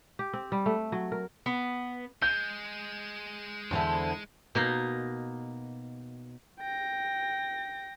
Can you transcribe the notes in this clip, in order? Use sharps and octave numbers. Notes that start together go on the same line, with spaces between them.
G4
C4
G3
A3
F#3
A#4
B3
G#3 G6
E2 D3 E4 C5 A5
B2 A#3 D#4
G5 A#6